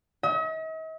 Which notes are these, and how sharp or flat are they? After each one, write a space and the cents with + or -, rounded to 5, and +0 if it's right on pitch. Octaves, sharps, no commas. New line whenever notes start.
D#5 +45